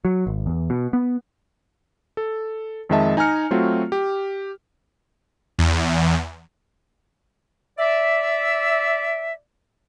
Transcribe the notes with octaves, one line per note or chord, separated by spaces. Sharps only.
F#3
G#1
E2
B2
B3
A4
F2 D#3 G#3 D#5 E5 A5
D#4 G#5 A#5 F6 C#7
F#3 A3 C4 F4 F#4
G4
E2
D5 E5